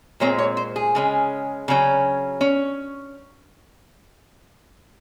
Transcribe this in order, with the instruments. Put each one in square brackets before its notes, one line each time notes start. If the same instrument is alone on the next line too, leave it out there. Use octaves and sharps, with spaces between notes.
[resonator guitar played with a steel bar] A#2 G#3 C4 C#5
C#5
C5
G#4
C#3 G#3 C#4
C#3 F#3 C#4
C#4